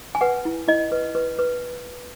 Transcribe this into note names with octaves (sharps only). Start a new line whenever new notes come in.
G#5
B4 F#5
E4
E4 D#5
B4
B4
B4